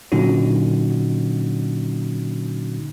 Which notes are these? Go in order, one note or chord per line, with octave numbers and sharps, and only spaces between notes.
A#2 D3 F#3 C#4 D#4 F#4